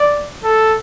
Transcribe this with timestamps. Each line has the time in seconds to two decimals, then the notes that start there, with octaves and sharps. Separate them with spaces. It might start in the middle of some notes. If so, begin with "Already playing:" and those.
Already playing: D5
0.44 A4